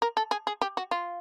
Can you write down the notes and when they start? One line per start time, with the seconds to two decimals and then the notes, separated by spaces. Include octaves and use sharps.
0.02 A#4
0.17 A4
0.31 G#4
0.47 G#4
0.61 G4
0.77 F#4
0.91 F4